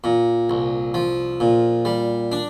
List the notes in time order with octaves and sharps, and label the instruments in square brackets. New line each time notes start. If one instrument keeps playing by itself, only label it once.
[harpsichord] A#2
C2
F3
A#2
G3
D4